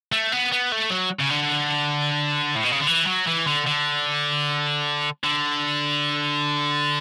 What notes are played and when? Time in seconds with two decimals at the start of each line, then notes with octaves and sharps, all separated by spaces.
0.12 A3
0.32 B3
0.52 B3
0.72 A3
0.90 F#3
1.20 C#3
1.31 D3
2.56 A2
2.64 B2
2.71 C#3
2.80 D3
2.87 E3
3.07 F#3
3.28 E3
3.47 D3
3.66 D3
5.24 D3